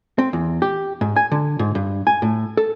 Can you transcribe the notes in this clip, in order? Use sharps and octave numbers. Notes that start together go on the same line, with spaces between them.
C4
E2
G4
G#2
G#5
D3
G#2
G2
G#5
A2
A4